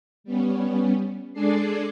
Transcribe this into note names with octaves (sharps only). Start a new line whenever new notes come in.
G3 B3 C#4
G#3 D4 G#4 A4 D5 C7